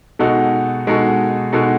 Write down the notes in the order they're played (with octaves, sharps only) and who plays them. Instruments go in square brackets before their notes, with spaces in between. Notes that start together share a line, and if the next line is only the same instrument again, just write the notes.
[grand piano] B2 G#3 D#4 F#4 A4
B2 G#3 D#4 F#4 A4
B2 G#3 D#4 F#4 A4